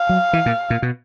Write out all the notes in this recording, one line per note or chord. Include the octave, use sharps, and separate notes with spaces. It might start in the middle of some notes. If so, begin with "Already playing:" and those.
Already playing: F5
F#3
E3
A#2
A#2
B2